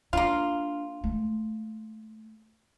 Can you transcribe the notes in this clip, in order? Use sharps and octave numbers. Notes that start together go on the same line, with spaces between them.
A#3 D4 F4
A3